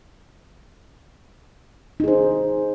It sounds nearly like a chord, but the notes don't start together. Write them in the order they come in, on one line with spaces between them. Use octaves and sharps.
D#4 G#4 C5